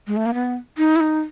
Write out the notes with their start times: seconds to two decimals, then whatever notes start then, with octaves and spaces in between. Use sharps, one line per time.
0.07 G#3
0.16 A3
0.26 A#3
0.34 B3
0.78 D#4
0.96 E4
1.00 D#4